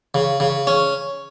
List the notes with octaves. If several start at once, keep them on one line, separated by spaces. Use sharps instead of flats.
C#3
C#3
C#4